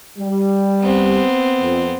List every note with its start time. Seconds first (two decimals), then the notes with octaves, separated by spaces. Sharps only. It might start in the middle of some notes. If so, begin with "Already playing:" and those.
0.19 G3
0.81 B3 C4
1.61 F2